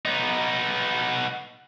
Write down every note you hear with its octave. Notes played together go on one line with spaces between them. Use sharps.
B3 D#4